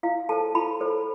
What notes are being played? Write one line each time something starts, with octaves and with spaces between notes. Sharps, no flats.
E4 F5
A4 C5 A5
E4 B5
A4 C5